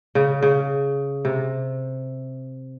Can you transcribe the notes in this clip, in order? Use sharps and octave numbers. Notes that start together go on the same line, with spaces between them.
C#3
C#3
C3